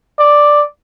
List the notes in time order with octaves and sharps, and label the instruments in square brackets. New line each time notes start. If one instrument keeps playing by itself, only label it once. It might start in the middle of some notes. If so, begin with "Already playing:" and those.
[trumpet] D5